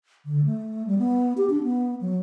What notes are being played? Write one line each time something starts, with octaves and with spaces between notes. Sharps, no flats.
D3
A3
G3
B3
G4
D4
B3
F#3